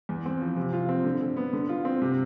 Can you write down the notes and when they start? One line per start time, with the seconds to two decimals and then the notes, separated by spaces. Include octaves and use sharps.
0.09 E2
0.25 C4
0.41 F3
0.56 C3
0.73 F4
0.89 C4
1.04 D3
1.20 D3
1.37 B3
1.53 D3
1.69 F4
1.85 C4
2.01 C3